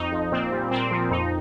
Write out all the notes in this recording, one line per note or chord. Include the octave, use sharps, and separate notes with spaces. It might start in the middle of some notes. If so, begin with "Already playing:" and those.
Already playing: F2 D#4
F3
A#2 C4
G3
A#2 C4
F3
F2 D#4